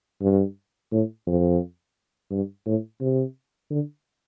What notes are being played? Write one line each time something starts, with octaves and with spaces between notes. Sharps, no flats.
G2
A2
F2
G2
A2
C3
D3